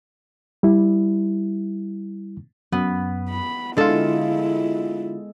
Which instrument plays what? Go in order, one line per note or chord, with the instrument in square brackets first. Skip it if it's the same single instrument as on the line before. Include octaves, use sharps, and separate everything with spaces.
[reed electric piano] G3 E4
[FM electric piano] F#2 [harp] B3
[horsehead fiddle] B5
[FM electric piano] D3 F4 [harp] G#3 A4 [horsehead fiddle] E4